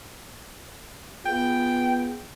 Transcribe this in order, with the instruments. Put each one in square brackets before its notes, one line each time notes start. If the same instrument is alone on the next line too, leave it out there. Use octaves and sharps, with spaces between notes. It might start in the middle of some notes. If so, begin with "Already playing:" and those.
[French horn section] B3 F4 G#4 [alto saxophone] G5